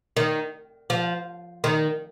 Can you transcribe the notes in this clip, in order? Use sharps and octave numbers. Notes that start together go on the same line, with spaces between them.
D#3
F3
D#3